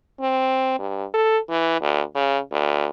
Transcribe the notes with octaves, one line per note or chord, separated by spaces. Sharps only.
C4
G2
A4
E3
D2
C#3
D2